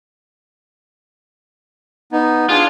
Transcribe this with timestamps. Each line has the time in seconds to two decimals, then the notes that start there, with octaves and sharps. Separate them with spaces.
2.12 B3 D#4
2.49 D4 F4 G#4